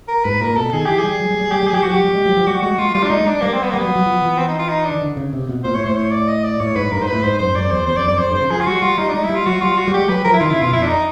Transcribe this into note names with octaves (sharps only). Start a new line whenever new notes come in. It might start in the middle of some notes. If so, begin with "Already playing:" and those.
A#4
G#2 B4
A#2 A#4
B2 A4
D#3 G#4
E3 G4
G3 G#4
F#3
G3
G3
G3 G4
G3
G#4
F#3 G4
F3 F#4
F#3 G4
G3
G#3
F#3
F3
G3 F#4
G#3 F#4
G#3 F4
G3 F4
D4
G#3 D#4
G#3
D4
G3 A#3
C4
B3
A#3
G3 B3
F#3
F#3
F3
E3
C4
D#4
F4
D#4
D4
D#3
D3
C#3
C3
B2
A#2 C5
A2 C#5
A2 C5
C#5
D5
D#5
D5
A2 C#5
G#2 B4
G2 A#4
G#2 C5
B4
A2
G#2 C5
F#2 C5
F#2 D5
E2 C5
E2 C5
F2 D5
F#2 D5
F2 C5
G2 C5
C#3
F3 G#4
F4
G3 F#4
G3 F4
G3 D#4
D4
G#3 D#4
G3 E4
F4
F#3 F#4
G3 F4
F#4
G3
G#3 G4
F#3 B4
F3 A#4
E4
D#3 F4
C#3 E4
B2 F4
F2 E4
D4
D#4